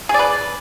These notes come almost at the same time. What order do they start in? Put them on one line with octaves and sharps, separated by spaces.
G#4 D5 B4